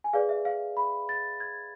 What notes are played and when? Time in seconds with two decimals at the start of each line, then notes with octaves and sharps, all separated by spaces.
0.04 G#5
0.13 G#4 B4 D5 F5
0.29 E5
0.45 F5
0.77 B5
1.09 A6
1.40 G#6